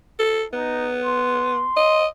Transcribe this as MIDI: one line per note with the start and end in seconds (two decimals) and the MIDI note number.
0.19 0.43 69
0.53 1.65 59
0.53 0.91 63
1.04 2.06 84
1.76 2.06 75